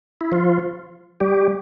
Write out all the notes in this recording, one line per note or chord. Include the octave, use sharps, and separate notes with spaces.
E4
F3 F4
G3 G4